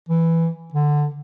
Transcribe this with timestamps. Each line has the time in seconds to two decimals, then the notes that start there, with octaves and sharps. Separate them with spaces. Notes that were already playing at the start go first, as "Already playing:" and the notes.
0.09 E3
0.74 D3